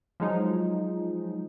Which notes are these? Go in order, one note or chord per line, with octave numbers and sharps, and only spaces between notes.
F3 F#3 G#3 D#4